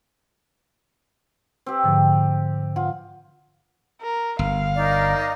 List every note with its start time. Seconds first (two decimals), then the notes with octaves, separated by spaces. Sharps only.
1.66 C4 G4
1.84 G#2 D3 F3
2.76 F4 F#5
4.02 A#4
4.39 G1 F5
4.75 D#4 A#4 D5